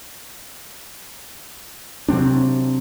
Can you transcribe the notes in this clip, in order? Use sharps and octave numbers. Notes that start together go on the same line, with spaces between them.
C3 F#3 C4 D4